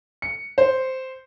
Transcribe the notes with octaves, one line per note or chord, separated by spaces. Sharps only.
C#7
C5